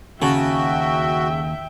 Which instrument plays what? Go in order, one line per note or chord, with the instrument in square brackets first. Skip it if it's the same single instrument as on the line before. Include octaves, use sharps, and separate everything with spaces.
[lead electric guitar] D#2 A5 [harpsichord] C#3 [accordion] F#4 [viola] E5 G5